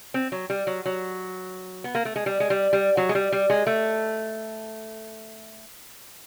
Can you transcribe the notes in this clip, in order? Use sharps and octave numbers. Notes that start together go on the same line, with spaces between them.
C4
F#3
G3
F#3
F#3
B3
A#3
A3
G#3
G3
G#3
G3
G3
F#3
G#3
G3
G3
G#3
A3